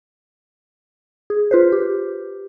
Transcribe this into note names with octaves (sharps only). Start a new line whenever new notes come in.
G#4
F4 B4 C5
G4